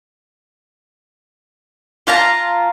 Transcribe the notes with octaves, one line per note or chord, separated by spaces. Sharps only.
F4 F5 A5 A#5